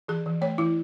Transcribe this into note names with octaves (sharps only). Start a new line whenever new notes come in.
E3 G#4
E3
A3 C#5
E3 E4